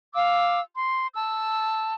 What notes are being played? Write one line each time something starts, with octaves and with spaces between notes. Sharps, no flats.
F5 D6 E6
C6
A5 E6